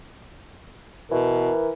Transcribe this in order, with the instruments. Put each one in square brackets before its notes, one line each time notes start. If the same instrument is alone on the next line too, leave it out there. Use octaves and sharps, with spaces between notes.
[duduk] B2 [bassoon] E3 [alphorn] A#4